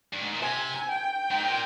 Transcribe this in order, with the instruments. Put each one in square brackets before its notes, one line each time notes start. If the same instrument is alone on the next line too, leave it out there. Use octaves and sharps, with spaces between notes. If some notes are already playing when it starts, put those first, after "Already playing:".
[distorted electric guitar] G2
G#2
A#2
[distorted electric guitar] C3 [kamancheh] G#5
[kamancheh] G5
[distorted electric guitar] G#2
A#2